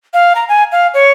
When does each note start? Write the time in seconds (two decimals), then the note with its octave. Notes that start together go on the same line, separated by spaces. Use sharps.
0.14 F5
0.35 A#5
0.49 G#5
0.72 F5
0.94 C#5